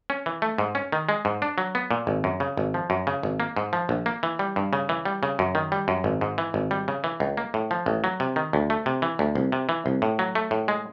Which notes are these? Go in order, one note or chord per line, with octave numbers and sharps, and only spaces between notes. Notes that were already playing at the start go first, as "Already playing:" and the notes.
C#4
E3
A3
G#2
C#4
D#3
G#3
G#2
D4
F#3
B3
A#2
G#1
F#2
C#3
G#1
F3
F#2
C#3
G#1
A#3
G#2
F3
A#1
A#3
E3
G3
G2
C#3
E3
G3
C#3
F#2
D#3
G3
F#2
G#1
G#2
E3
G#1
G3
C#3
E3
C#2
A#3
A2
F3
A1
F#3
C3
D#3
D2
A3
C3
E3
D2
C2
C3
E3
C2
A2
F#3
A3
A2
G#3